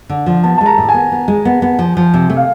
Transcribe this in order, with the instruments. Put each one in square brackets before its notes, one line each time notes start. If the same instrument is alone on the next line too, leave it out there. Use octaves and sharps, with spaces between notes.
[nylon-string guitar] D3
F3
[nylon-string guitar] B3 [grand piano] A5
[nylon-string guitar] G#3 [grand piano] A5
[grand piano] A#5
[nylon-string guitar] A2
[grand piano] G#5
[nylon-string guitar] B3
B3
G#3
B3
B3
F3
F3
C3
A3
[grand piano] F5